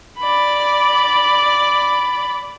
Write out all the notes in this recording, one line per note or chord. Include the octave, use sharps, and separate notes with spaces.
D5 B5